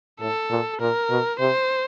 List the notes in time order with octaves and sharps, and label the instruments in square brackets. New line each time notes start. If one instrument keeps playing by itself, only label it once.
[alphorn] A2 [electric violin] A4
[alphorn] A#2
[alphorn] A#2 [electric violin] A#4
[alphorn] B2
[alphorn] C3 [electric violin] C5